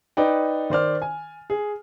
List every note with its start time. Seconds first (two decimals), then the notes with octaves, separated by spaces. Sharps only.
0.17 D#4 B4 D5 G5
0.70 D#3 C5 D5 F6
1.02 G#5
1.50 G#4